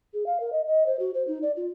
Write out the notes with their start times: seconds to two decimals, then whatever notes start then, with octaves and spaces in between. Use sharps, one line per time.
0.13 G#4
0.26 F5
0.40 A#4
0.52 D#5
0.67 D#5
0.86 C5
0.99 F#4
1.14 C5
1.27 D#4
1.42 D5
1.56 F4